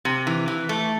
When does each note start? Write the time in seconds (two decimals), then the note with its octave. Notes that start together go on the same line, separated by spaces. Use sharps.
0.05 C3
0.27 E3
0.48 E3
0.69 A3